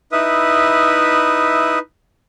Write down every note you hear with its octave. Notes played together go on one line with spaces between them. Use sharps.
D#4 E4 B4 E5 D#6